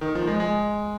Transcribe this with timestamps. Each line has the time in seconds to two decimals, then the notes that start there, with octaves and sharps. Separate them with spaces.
0.01 D#3
0.15 F3
0.27 G#3
0.40 G#3